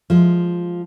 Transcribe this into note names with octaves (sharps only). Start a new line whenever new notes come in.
F3 G#3